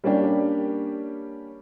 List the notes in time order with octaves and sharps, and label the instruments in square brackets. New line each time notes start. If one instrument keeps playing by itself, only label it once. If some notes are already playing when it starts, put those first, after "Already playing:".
[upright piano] G3 A#3 C#4 D4 G4